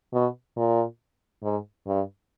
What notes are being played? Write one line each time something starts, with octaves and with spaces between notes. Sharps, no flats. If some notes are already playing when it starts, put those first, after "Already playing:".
B2
A#2
G#2
G2